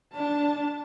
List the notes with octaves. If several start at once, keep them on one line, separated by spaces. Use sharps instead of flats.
D4 A5